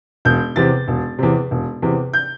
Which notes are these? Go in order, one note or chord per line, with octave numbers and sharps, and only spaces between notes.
E1 G6
E2 C3 A6
E1
E2 C3
E1
E2 C3
G6